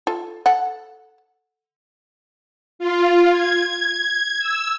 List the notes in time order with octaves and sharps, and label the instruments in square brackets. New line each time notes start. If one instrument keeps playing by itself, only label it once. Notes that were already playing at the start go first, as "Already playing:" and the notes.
[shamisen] F4 A4
A4 F#5
[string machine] F4
G#6
E6